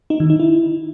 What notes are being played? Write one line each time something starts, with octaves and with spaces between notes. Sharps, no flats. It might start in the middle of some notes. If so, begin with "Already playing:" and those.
D#4
D#3
D#4
E4